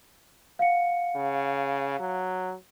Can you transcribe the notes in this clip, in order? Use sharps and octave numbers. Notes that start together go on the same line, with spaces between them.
F5 F#5 C#7
C#3
F#3